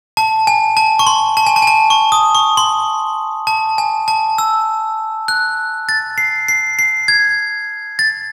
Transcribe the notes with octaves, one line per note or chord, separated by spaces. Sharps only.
A5
G#5
A5
C#6
C6
A5
G#5
A5
G#5
A5
C#6
D#6
C#6
C6
A5
G#5
A5
E6
F#6
A6
C7
C7
C7
G#6
A6